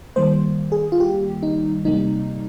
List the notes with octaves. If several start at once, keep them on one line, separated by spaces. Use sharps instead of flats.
D#3 G3 A#3 C5
G#4
F4
G4
D#4
C3 G3 A#3 D#4